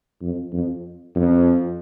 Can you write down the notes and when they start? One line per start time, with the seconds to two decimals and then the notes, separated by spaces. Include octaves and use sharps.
0.22 F2
0.53 F2
1.15 F2